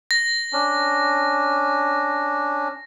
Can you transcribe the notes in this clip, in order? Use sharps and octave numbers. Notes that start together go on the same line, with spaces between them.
A#6
C#4 D4